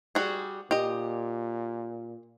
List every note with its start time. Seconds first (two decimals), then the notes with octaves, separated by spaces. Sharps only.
0.15 G3 F#4 G#4
0.71 A#2 G4 D#5